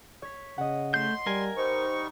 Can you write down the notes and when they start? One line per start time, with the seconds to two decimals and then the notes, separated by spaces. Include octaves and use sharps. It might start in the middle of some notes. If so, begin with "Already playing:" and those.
0.22 C#5 B6
0.58 C#3 D#5 F#5
0.94 A3 C6 G6
1.27 G3 A#4 G#5
1.57 G3 D#4 C5 C#6